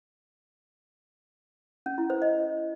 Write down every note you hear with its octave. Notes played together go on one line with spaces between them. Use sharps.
C#4
E4
C5
D#5